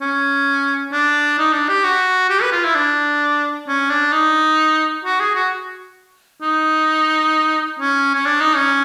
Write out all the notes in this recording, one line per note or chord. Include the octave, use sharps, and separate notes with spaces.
C#4
D4
D#4
D4
G4
F#4
G4
B4
F4
E4
D4
C#4
D4
D#4
F#4
G#4
F#4
D#4
C#4
C#4
D4
D#4
C#4